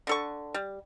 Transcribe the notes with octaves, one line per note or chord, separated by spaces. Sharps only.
D3 A4 C#6
G3